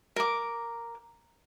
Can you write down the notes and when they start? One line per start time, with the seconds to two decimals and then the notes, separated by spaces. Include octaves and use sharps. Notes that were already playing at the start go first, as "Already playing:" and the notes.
0.16 A#4 D6